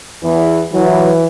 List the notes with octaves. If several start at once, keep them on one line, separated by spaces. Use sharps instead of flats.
E2 E3
E3 F#3